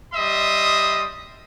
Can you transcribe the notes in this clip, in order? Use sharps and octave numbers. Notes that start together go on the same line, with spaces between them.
G3 D#5 E5 C6 D#6